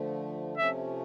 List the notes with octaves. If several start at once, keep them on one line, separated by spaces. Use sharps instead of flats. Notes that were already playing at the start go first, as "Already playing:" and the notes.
Already playing: D3 F3 A3
C3 F3 A3 C#4 E5